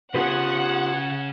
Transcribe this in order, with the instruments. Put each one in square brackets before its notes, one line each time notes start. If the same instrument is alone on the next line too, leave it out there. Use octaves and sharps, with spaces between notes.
[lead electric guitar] C#3 G#4 [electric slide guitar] F4 G4 B4 [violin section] F#5